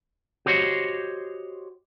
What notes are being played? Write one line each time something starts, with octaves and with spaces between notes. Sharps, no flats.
F#4 G4 C5 C#5 D#5